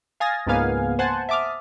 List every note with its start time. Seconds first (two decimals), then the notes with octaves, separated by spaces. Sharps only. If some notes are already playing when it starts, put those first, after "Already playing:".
0.20 F5 G#5 D#6 A6 A#6
0.46 C#2 G#2 A#3 B3 F5 G#5
0.99 C5 F#5 G#5 A5
1.29 E5 A5 D6 D#6 F6